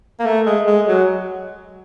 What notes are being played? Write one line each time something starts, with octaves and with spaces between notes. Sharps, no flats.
A#3
A3
G#3
G#3
F#3